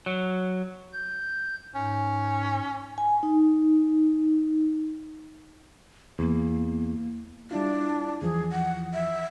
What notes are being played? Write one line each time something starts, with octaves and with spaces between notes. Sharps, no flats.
F#3
G6
G#2 C#4
G#5
D#4
E2 A#3
G3 D4 E4 F4
E2 E3 F3 G#4
F#5
E5